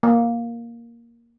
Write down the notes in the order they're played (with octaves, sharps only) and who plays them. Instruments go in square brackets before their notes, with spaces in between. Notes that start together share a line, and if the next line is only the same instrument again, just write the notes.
[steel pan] A#3